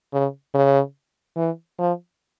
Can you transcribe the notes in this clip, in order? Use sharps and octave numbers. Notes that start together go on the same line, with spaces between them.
C#3
C#3
E3
F3